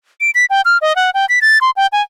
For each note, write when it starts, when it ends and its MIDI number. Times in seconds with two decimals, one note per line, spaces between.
0.21 0.31 98
0.35 0.45 95
0.50 0.61 79
0.65 0.78 89
0.81 0.95 75
0.96 1.10 78
1.14 1.26 79
1.29 1.39 95
1.42 1.58 93
1.61 1.71 84
1.77 1.87 79
1.93 2.02 80